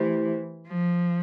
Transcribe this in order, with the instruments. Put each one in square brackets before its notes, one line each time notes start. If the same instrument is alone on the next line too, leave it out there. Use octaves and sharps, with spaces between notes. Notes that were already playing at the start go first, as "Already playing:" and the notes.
Already playing: [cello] E3 [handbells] A3 E4 G4 C5
[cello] F3